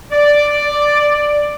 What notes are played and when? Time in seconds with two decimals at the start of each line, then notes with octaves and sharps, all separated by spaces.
0.12 D5